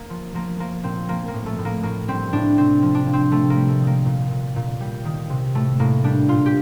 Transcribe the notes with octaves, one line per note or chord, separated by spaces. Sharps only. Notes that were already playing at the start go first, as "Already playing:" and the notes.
Already playing: A#3
F3
F3 A#3
F3 A#3
A#2 C4
F3 A#3
A#3
A2
A3
A2
A#3
A2 A#3
G3 C4
A2 D4
C3 C4
F3
D4
F3
C4
C3 A3
A#3
G3
A3
D#3
A#3
A#2
A#2
A#2
G3
D#3
C3
A2 A3
A2 A#3
G3 D4
A#2 F4
G4